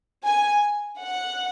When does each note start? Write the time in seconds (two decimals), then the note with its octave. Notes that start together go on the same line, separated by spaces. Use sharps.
0.23 G#5
1.00 F#5